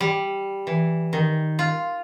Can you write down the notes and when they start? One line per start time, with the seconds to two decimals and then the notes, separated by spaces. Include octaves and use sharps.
0.01 G3
0.67 E3
1.13 D#3
1.59 F4